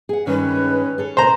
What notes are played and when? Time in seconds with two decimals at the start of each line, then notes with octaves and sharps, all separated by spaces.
0.09 G#4 F#5
0.27 G2 D#3 G3 G#3 C#4 B4
0.98 G#4 A4 C#5
1.17 C3 C5 A#5